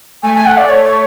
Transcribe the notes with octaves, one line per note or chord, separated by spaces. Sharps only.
A3 G#5
G#5
F#5
D5
C#5
C#5